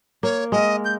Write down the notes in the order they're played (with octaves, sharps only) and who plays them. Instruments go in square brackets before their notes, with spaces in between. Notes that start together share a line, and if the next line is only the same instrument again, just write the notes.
[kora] A#3 [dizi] C#5
[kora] G#3 A#4 [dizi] D#5
[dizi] G6